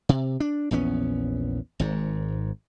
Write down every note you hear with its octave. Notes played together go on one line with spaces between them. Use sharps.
C3
D4
A#1 E2 B3 C#4
G#1 G#2